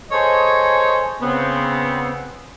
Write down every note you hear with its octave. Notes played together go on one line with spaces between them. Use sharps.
G#4 A4 C5 C#5 D#5 G#5
C#3 B3 C4